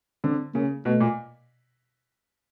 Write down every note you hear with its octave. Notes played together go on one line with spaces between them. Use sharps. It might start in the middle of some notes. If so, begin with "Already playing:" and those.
D3 C4
C#3 A#3
B2 A3
A#2